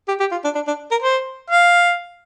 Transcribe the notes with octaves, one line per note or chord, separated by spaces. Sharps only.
G4
G4
F4
D4
D4
D4
A#4
C5
F5